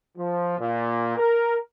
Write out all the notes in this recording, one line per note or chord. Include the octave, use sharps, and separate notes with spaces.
F3
A#2
A#4